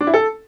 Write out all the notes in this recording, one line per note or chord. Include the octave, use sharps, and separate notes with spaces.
D4
E4
A4